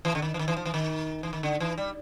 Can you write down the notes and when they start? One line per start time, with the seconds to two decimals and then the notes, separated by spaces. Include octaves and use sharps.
0.05 E3
0.15 D3
0.22 D#3
0.34 E3
0.39 D#3
0.48 E3
0.57 F3
0.65 E3
0.74 D#3
1.23 E3
1.33 D#3
1.43 D3
1.60 E3
1.78 G3